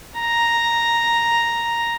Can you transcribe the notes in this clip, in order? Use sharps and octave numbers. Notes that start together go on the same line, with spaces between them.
A#5